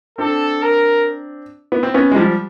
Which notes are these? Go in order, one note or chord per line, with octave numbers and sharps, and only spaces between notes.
C4 D4 A4
A#4
B3
C4
B3 C#4
G#3
F3 G3